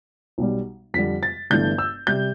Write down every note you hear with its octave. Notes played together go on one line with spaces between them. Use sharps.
B1 B2 G3
F2 D3 G3 B6
A6
G1 G2 E3 A3 G6
E6
C3 G3 G6